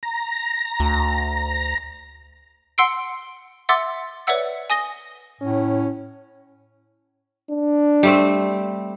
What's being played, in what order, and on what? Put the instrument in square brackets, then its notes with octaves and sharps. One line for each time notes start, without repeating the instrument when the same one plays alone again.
[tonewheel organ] A#5
[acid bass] D2
[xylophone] F#5 C6 E6 C7 D7
E5 F#5 C6 D6 E6 A6
B4 C#5 D5 E5 F#5 E6
G#5 D#6 A#6 G7
[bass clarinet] A2 [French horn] C#4
[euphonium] D4
[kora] G3 A3 C4